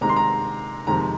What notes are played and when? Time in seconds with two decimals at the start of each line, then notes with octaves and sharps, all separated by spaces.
0.01 C3 D#3 G#3 A#5
0.09 C6
0.16 A#5
0.87 F2 C3 D#3 G#3 A#5